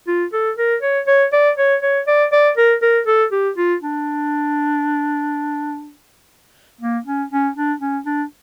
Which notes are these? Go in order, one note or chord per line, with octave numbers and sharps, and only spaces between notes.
F4
A4
A#4
C#5
C#5
D5
C#5
C#5
D5
D5
A#4
A#4
A4
G4
F4
D4
A#3
C#4
C#4
D4
C#4
D4